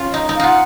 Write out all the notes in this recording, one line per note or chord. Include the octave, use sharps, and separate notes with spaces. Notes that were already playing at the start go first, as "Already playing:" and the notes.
Already playing: C#4 F4
D#4 D#5
D#4
F5
D#4 F4 F#5